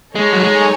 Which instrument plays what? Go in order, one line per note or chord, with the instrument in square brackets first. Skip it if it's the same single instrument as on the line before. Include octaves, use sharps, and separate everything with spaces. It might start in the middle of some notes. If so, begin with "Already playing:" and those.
[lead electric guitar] G#3 [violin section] D#4 A4 C#5 G#5
[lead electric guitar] F#3
G#3